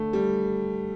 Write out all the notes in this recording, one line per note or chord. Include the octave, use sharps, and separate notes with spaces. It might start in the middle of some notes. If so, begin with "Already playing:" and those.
Already playing: D3 A3
G3